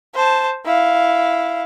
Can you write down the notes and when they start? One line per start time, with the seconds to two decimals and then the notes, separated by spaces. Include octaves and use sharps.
0.15 C5 A5
0.65 E4 F5